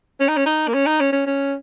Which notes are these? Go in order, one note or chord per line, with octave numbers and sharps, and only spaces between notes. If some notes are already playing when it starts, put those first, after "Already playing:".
C#4
D#4
C#4
D#4
A#3
C#4
D#4
C#4
C#4
C#4